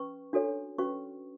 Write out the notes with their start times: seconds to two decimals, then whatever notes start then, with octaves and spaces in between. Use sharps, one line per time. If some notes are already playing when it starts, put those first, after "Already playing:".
Already playing: C#4 B4 C#6
0.33 D4 F#4 A4 C#5
0.78 C#4 F#4 B4 C#6